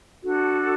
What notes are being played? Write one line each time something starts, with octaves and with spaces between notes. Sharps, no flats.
D4 F#4 A4